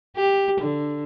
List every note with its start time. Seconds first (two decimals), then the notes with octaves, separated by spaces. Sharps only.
0.17 G4
0.60 D3